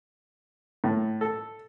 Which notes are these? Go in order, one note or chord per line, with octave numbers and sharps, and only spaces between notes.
A2
A4